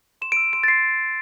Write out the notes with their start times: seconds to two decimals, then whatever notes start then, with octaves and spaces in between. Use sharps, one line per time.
0.22 C6 E7
0.32 D7
0.37 E6
0.53 C6 D7
0.63 A6
0.68 C6 C7